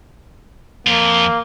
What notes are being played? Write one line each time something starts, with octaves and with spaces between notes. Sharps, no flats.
F2 A#3 F4